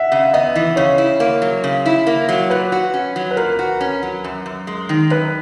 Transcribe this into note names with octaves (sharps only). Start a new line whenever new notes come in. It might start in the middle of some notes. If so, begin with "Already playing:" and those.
Already playing: E5 F#5
C#3
B3 D#5
E3
C#3 C#5
E4
A#3
F#3
C#3
E4
A#3
F#3
A#2 B4
F#4
C#4
F#3
B4
A#2 A#4
F#4
C#4
F#3
F#2
F#2
G#3
D#3
F#2 B4